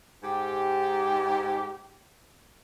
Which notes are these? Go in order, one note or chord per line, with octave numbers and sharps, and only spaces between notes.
G#2 G4